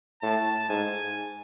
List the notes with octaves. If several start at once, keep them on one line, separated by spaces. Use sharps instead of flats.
A2 A5
G#2 G#5